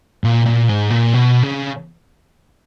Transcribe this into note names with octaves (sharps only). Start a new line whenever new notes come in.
A#2
A#2
G#2
A#2
B2
C#3